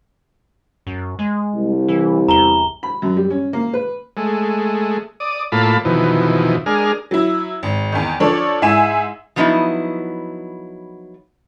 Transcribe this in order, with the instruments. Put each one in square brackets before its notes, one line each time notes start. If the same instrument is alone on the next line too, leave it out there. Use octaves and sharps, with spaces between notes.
[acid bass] F#2
G#3
[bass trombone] C2
[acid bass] E3
[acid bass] E2 [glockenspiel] A#5 G7
[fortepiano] B5
F#2
G3
C#4
A#3
B4
[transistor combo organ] G#3 A3
D5 D#6
A2 A#3 F4 A5 B5
F2 B2 D#3 E3
G#3 D4 G#4 A#4 F6
[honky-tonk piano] F#3 E4
G#1
E2 D#3
F3 D4 A4 C#5 D5
G#2 E4 E5 G#5 E7
[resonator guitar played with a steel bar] F3 F#3 B3 D#4 E4